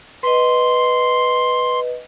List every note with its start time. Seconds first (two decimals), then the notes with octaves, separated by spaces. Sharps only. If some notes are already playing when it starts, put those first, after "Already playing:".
0.23 B4 D#5 C6